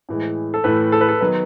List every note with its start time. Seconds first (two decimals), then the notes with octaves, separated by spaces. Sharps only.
0.09 A2 E3 G#3
0.54 A4
0.64 A2 E3 A3 B4
0.92 A4
1.01 B4
1.08 A4
1.21 D#3 F#3 B3 B4